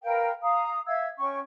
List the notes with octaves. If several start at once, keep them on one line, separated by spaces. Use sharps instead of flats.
A#4 B4 F5 G5
F5 A#5 D#6
E5 F5 E6 G#6
C#4 G5 C#6